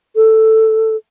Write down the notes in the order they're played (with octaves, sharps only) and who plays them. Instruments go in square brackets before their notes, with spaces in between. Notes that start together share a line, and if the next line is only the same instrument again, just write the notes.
[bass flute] A4